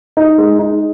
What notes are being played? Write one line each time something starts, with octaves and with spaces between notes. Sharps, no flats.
D#4
G#3
D#4